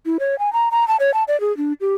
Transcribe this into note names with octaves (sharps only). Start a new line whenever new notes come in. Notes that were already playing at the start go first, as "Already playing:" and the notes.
E4
C#5
G#5
A#5
A#5
A5
C#5
A5
D5
G#4
D4
G4